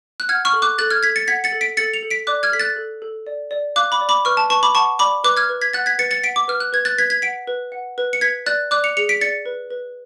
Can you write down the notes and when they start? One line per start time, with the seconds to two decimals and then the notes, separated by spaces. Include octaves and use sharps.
0.20 F#6
0.29 F#5 F6 G#6
0.45 C#6 F6
0.53 A4
0.62 D6 F#6
0.78 A4 F#6 A6
0.91 F6 G#6
1.03 A4 G#6 B6
1.16 A6 C#7
1.28 F#5 G#6 B6
1.44 A6 C#7
1.52 A4
1.61 B6 D7
1.77 A4 A6 C#7
1.94 C#7 F7
2.02 A4
2.10 B6 D7
2.27 D5 D6 F#6
2.43 F6 G#6
2.52 A4 B6
2.60 F#6 A6
2.76 A4
3.02 A4
3.27 D5
3.51 D5
3.76 F5 D6 F#6
3.92 B5 D6
4.01 D5
4.09 B5 D6
4.25 B4 C#6 F6
4.37 A5
4.50 B4 A5 C#6
4.63 B5 D6
4.75 F#5 A5 C#6
4.99 D5 B5 D6
5.24 B4 D6 F#6
5.37 F6 G#6
5.49 B4
5.62 G#6 B6
5.73 F#5 F#6 A6
5.86 G#6 B6
5.99 B4 A6 C#7
6.11 A6 C#7
6.24 F#5 B6 D7
6.36 D6
6.48 B4 F6
6.60 F#6
6.73 B4 G#6
6.85 F#6 A6
6.98 B4 G#6 B6
7.10 G#6 B6
7.22 F#5 B6 D7
7.47 B4
7.72 F#5
7.98 B4
8.13 C#7
8.21 B4 G#6 B6
8.46 D5 F#6 A6
8.71 D5 D6 F#6
8.84 C#7 F7
8.97 G#4 C#7 F7
9.09 B6 D7
9.21 D5 A6 C#7
9.46 B4
9.71 B4